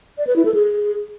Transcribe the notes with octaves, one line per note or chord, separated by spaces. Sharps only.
D5
B4
E4
A4
G#4